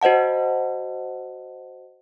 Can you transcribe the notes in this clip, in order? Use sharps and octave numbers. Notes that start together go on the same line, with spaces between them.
F#4 C5 D#5 F#5 A5